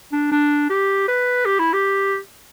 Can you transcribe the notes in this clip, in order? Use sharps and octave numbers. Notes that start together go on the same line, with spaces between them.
D4
D4
G4
B4
G4
E4
G4